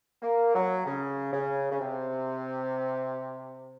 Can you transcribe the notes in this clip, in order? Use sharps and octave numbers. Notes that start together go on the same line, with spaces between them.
A#3
F#3
C#3
C#3
C#3
C3